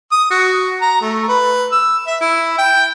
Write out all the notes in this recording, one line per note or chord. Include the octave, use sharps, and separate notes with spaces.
D#6
F#4
A#5
A3
B4
E6
E5
E4
G5